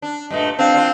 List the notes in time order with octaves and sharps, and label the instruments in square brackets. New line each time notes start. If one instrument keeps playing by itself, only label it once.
[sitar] D4
[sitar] G2 A#2 A3 [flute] D#5
[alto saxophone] C4 [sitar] D4 [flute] F5
[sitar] D4 F4